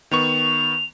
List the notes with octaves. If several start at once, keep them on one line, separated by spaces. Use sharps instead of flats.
D#3 B3 C#6 F7